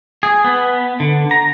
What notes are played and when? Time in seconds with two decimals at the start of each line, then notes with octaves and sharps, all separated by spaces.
0.23 G#4
0.44 B3
1.00 D3
1.31 A#5